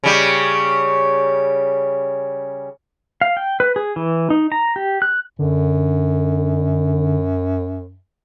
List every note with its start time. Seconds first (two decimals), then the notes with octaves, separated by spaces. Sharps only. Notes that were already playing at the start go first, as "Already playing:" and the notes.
0.04 C#3 G3
3.21 F5
3.37 G5
3.60 B4
3.76 G#4
3.96 E3
4.30 D#4
4.52 A#5
4.76 G4
5.02 F#6
5.39 F#2 D3